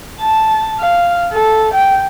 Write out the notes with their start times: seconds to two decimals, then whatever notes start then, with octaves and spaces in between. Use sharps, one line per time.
0.21 A5
0.80 F5
1.32 A4
1.74 G5